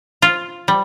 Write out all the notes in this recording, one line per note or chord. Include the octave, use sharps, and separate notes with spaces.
F4
G3